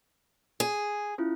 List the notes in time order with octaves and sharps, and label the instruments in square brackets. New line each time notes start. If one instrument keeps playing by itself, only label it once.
[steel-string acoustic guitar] G#4
[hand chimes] C#4 E4 F4